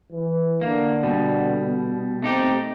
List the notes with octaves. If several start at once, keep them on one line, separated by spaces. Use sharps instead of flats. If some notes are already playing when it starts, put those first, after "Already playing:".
E3
D3 A#3
B2 G3
A3 C4 D#4 G4